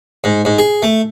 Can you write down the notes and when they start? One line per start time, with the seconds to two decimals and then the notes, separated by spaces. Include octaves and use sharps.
0.24 G#2
0.45 G#2
0.58 G#4
0.82 A3